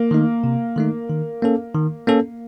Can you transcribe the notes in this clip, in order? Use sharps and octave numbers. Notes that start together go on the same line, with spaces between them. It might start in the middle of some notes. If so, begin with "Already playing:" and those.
Already playing: A#3
D#3 A3 D#4
C3
D#3 A3 D#4
D#3
A#3 C#4 A4
D#3
A#3 C#4 A4